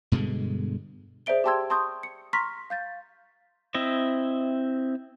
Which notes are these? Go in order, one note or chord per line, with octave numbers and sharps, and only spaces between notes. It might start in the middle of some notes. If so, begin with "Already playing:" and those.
G2 B2 D3 G#3
G#4 C5 D5 E5 D7 G7
G4 G5 A5 C6 E6 G#6
A5 C6 C#6 D#6 G6
C#7
A#5 C6 C#6 F6 A#6 B6
F5 G6 A6
C4 E4 D#5 E5